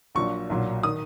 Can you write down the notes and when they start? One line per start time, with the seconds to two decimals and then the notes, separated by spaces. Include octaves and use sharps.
0.15 A#1 A#2 F#3 C#6
0.50 B1 A#2 F#3
0.83 D#3 D#6